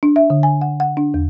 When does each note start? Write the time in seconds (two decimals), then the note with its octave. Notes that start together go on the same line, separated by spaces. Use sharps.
0.03 D4
0.16 E5
0.30 D3
0.43 G#5
0.62 F#5
0.80 F#5
0.97 D4
1.14 E2